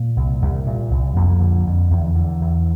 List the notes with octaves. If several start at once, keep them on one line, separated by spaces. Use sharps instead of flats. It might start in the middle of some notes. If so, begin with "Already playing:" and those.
Already playing: A#2
C2
C2
A#2
C2
F2 A#3
D3
F2
E2
D3
E2